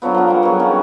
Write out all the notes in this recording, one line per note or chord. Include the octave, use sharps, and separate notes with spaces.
D3 F3 F#3 B3
F3 A#3
G3 A#3 F#5
F#3 B3 G#4
D#3 G3 A#3 C#4